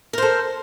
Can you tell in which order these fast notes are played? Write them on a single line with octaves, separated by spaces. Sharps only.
A#4 C5 A4